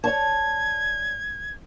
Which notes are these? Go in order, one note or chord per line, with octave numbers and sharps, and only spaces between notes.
C#5 D5 A5 G#6